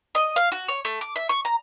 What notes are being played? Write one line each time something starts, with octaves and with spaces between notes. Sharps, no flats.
D#5
F5
F#4
C#5
A3
D6
E5
C#6
A#5